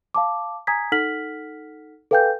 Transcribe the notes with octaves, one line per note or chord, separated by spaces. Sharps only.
F5 A5 D6
G#5 A#5 D#6 G#6 B6
D#4 A4 F#5 F6 B6 F#7
A4 B4 F5 G5 G#5 G6